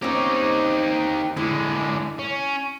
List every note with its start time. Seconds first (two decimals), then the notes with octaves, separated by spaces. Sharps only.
0.02 C4 C#4 D#4 G4
1.37 D3 G#3 E4
2.19 C#4